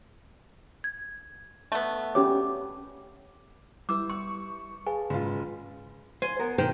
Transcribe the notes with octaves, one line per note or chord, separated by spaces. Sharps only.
G#6
A3 B3
C#4 G4 C#5 D6
G3 E4 B4 D6 E6
C6 C#6
G#4 B4 F5 G#5 A5
F#1 G#2 F4
C5 G#5
B3 A#4
B1 D#3 C5 G5